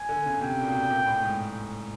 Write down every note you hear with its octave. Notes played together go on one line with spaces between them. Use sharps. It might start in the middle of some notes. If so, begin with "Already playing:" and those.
Already playing: G#5
D3
C#3
C3 G5
A#2
B2
A#2
A2
G#2